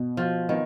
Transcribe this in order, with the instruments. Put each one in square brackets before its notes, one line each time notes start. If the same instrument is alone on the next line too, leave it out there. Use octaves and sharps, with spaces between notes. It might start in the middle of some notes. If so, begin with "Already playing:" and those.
Already playing: [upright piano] B2
[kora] F3 [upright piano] F#4
[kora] D#3 [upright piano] B3